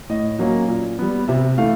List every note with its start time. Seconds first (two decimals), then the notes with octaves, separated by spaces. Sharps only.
0.10 A2 D#5
0.39 F#3 A#3 C#4
0.68 A#2
0.99 G3 B3
1.28 C3 E5
1.58 E3 A3 F5